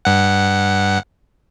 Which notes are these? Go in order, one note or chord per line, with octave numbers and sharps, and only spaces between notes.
G2 F#5